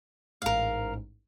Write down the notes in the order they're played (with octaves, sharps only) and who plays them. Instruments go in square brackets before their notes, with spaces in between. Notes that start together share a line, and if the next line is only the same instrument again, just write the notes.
[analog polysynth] A1 G#2 [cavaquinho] A#4 F5